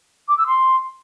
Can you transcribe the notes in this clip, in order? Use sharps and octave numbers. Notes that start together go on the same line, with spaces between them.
D6
E6
C6